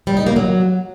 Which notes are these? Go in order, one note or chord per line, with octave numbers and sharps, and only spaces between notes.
G3
D#4
A#3
F#3